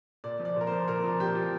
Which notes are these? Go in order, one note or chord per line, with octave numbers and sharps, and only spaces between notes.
A#2 D5
F3
D5
A#2 A#4
F3 C5
A#2 A#4
F3
A#2 G4
F3